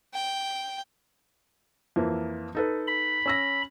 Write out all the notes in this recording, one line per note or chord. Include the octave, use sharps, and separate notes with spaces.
G5
F2 E3 A#3
D#4 A4 B4
B5
C#4 E6 A#6